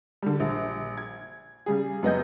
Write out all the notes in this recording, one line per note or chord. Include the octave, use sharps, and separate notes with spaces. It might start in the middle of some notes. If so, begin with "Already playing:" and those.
D3 G3
A#1
G#6
C#3 G3 G#4
F#2 B3 D#5 G6